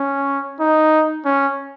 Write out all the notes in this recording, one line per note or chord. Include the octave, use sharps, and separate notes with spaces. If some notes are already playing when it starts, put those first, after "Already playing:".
Already playing: C#4
D#4
C#4